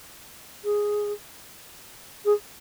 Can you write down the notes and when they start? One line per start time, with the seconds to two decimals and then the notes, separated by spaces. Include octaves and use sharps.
0.64 G#4
2.25 G#4